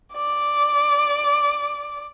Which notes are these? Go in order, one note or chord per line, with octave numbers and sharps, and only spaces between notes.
D5 D6